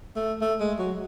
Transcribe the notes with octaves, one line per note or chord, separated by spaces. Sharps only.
A3
A3
G#3
F#3